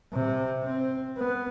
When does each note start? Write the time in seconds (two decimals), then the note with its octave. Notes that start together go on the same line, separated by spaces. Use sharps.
0.13 C3
0.64 C4
1.18 B3